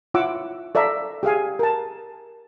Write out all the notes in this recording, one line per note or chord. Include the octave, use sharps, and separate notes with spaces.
E4 F4 C#5 F#5 D6 E6
A4 D5 E5 F5 A#5
G4 G#4 F5 G#5
A#4 A5